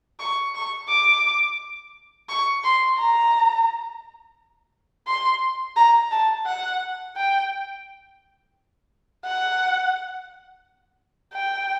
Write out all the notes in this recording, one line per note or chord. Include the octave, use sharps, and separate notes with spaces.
C#6
C#6
D6
C#6
C6
A#5
C6
A#5
A5
F#5
G5
F#5
G5